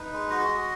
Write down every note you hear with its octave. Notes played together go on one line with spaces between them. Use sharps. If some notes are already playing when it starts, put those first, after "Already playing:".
Already playing: D#4 B4
G#3
F#4 D#5
F#4